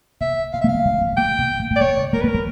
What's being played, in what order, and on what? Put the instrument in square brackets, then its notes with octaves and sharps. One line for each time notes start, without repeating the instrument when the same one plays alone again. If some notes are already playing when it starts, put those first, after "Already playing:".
[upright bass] C3 [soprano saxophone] E5
[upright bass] B2 [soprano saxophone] F5
[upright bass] C3 [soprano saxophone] E5
[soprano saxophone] F5
[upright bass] D3
D#3
F#3
F3
F#3
[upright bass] F3 [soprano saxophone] G5
[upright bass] C3
B2
A#2
A2
A2
[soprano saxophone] D5
[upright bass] B2 [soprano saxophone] C#5
[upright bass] C#3
[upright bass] D#3 [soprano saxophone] A#4
[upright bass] B2 [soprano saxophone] B4
[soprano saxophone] A#4
[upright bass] A#2